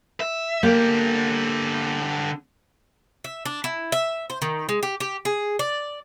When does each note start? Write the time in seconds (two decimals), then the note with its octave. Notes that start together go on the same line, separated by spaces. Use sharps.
0.20 E5
0.63 D3 A#3 G4
3.24 E5
3.45 D4
3.64 E4
3.92 E5
4.30 C5
4.42 D#3
4.69 G#3
4.83 G4
5.00 G4
5.25 G#4
5.59 D5